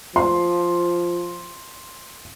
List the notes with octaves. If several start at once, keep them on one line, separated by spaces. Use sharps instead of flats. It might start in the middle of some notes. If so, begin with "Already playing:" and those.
F3 C6